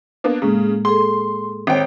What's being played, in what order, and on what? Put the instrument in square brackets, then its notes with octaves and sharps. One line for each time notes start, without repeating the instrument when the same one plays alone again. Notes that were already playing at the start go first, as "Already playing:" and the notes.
[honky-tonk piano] A#3 B3 D4
[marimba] A2 G#3 A#3 [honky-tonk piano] C#3
[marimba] G#4 A4 [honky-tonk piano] C6
[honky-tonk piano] G#1 G5 [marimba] C4 C5 C#5